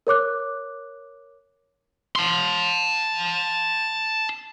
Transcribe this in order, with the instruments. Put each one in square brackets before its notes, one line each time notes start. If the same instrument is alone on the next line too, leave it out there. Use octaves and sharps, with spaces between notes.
[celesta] A#4 C#5 D6 F#6
[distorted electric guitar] A5 C6